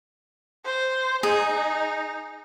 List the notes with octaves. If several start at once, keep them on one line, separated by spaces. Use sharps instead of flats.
C5
D#4 G#4